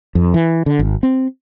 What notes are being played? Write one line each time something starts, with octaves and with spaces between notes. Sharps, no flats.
F2
E3
D3
G#1
C4